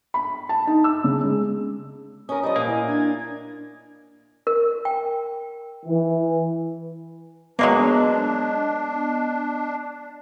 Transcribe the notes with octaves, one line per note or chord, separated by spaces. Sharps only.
B5
A5
D#4
E6
C#3
G#3
C#4 A#4 D#6
F3 G3 D#5 D#6
A#2 A#3
E4 G#5
D4 G#6
A#4
G5
E3
F#3 G#3 A#3 B3 D4 D#5